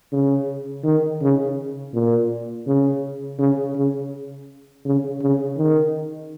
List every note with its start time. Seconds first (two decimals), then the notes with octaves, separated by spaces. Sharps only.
0.12 C#3
0.84 D#3
1.22 C#3
1.94 A#2
2.67 C#3
3.39 C#3
3.76 C#3
4.85 C#3
5.22 C#3
5.57 D#3